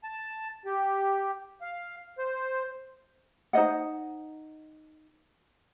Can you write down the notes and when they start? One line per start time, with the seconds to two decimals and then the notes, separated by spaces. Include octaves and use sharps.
0.04 A5
0.65 G4
1.61 F5
2.18 C5
3.53 D#4 C5 D#5 F#5